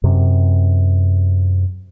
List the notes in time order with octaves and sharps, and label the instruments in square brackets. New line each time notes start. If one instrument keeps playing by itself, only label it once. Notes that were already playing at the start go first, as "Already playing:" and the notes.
[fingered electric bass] F#2 C3